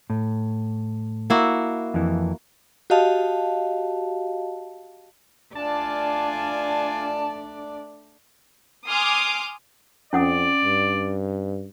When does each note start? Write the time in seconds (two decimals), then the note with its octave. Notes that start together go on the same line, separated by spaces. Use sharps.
0.10 A2
1.30 A#3 E4 F#4
1.94 F2 E3
2.90 F#4 G4 D#5 F5 A5
5.55 A3 D4 F4 D5 F5 G#5 A5
8.86 G#5 C6 D6 D#6 F6
10.13 F2 C#4 D5 F#5 D#6
10.64 G2